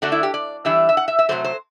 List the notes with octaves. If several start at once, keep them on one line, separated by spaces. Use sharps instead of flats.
D3 A3 D4 F#4
E4
G4
D5
E3 G3 D4 E5
E5
F#5
E5
E5
C3 F#3 A3 C5
C5